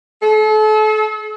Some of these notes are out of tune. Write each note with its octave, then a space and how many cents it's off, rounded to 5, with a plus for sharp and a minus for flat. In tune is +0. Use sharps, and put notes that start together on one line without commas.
A4 -35